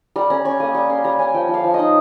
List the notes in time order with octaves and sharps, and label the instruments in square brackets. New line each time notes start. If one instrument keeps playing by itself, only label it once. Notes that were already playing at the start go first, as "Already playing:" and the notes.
[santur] G3 A#5
C#4 A#5
C#4 C#6
A#3 D#6
G3 C#6
C#4 C6
G3 A#5
C#4 G#5
F3 G5
F3
F5
F3
D#4 D#5